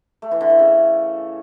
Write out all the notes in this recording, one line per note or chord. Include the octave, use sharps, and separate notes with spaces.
A3
E3
D3
E3
C#3